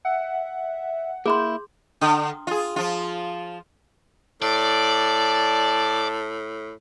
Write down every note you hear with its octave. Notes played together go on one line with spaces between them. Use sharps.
E5 F#5
A#3 E4 G#4 C6 G6
D3
F4 G#4
F3 F4
A2 D5 A5